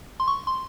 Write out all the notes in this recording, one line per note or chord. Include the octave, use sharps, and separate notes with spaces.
C6
C#6
C6